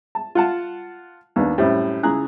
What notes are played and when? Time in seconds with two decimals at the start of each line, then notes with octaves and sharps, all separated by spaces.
0.15 A5
0.35 F4 F#5 A5
1.36 D#2 B3 D4
1.58 F#2 A2 G3 C4
2.03 C#2 C#3 E4 G#4 A#5 F#6